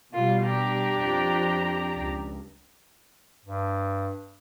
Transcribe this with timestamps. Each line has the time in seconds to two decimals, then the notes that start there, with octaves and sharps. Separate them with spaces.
0.13 B2 G3 F4
0.45 D4 G4 A#5
0.95 F2
1.94 C#2
3.45 G2